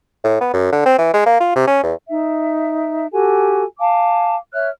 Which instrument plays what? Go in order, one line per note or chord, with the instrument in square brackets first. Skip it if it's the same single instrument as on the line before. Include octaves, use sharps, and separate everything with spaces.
[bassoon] A2
B3
F#2
D3
C4
E3
G#3
A#3
F4
C3
C#4
E2
[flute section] D#4 E5
F#4 G4 A4 G#5
F5 G#5 A5 D6
C#5 E5 F6 F#6